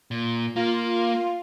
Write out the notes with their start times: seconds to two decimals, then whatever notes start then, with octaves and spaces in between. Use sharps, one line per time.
0.11 A#2
0.56 A#3 F4